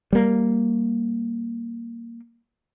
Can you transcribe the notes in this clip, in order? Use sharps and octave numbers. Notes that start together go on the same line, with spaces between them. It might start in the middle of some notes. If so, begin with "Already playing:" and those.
G3 A#3